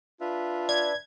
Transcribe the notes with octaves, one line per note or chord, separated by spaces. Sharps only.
D4 F4 B4 E5
D5 G#6